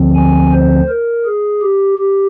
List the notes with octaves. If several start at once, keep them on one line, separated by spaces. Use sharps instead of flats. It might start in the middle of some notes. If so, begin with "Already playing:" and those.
Already playing: D2 D3 F3 C4
G#5
C5
A#4
G#4
G4
G4